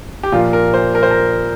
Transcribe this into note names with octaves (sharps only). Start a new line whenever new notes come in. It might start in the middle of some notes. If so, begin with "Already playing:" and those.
G4
A#2 F3 A#3 F4
A#4
C5
A#4
C5
A#4